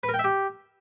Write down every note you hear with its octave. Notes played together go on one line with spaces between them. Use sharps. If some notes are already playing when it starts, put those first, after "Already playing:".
B4
A#4
G5
E5
G4